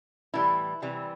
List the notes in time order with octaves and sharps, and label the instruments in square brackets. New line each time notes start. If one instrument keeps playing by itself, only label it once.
[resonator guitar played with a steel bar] A2 E3 G3 E4
C3 E3 G3